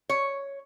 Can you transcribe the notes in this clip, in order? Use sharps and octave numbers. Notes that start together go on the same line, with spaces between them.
C#5